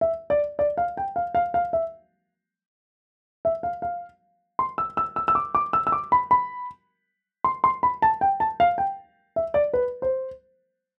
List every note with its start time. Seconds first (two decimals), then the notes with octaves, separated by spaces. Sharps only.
0.01 E5
0.30 D5
0.59 D5
0.78 F5
0.97 G5
1.16 F5
1.35 F5
1.54 F5
1.73 E5
3.45 E5
3.63 F5
3.82 F5
4.59 C6
4.78 E6
4.97 E6
5.16 E6
5.28 E6
5.35 D6
5.55 D6
5.73 E6
5.87 E6
5.92 D6
6.12 B5
6.31 B5
7.44 C6
7.64 C6
7.83 B5
8.02 A5
8.21 G5
8.40 A5
8.60 F5
8.78 G5
9.36 E5
9.54 D5
9.73 B4
10.02 C5